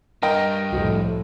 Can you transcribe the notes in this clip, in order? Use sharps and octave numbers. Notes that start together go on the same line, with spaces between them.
G2 A#4 D#5 G5
C2 F2 A2 F#4